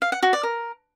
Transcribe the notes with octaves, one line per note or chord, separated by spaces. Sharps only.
F5
F#5
F#4
D5
A#4